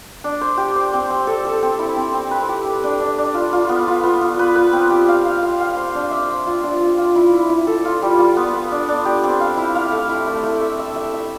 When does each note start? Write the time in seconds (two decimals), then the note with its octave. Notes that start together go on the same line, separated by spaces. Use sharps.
0.24 D4
0.41 C5
0.58 G4
0.76 C5
0.93 C4
1.10 C4
1.27 A4
1.45 A4
1.63 C4
1.79 E4
1.97 C4
2.14 C4
2.31 B4
2.49 G4
2.66 B4
2.84 D4
3.00 D4
3.18 D4
3.34 F4
3.53 F4
3.69 B3
3.87 F4
4.04 B3
4.21 F4
4.39 B4
4.55 B4
4.73 C4
4.90 G4
5.09 F5
5.25 F5
5.43 F5
5.60 F5
5.77 C5
5.95 D4
6.11 E5
6.28 C5
6.47 F4
6.63 D4
6.80 F4
6.98 F4
7.16 E4
7.33 E4
7.50 E4
7.67 A4
7.85 F4
8.02 G3
8.19 F4
8.37 B3
8.53 B4
8.71 D4
8.89 D4
9.05 G4
9.24 C4
9.40 F5
9.57 E4
9.75 F5
9.92 A3
10.09 E4
10.27 A3
10.44 A3
10.61 E5
10.79 E5
10.96 E5
11.14 E5